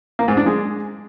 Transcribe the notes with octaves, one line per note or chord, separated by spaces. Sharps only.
A#3
G#2
D4
G#3